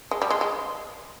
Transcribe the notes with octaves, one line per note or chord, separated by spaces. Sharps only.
G#3
G3
G#3
G#3